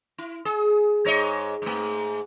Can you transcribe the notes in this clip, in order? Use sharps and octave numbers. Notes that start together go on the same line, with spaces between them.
E4
G#4
G#2 C#5 D#5
G#2 A3